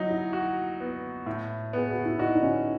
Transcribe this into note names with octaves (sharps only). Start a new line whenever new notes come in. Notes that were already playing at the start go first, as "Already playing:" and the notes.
Already playing: F#3 D#4 E4 F#4
E4
F#4
B3
A2
B3 G#4
F#4
E4
D#4 F#4
D#4
C#4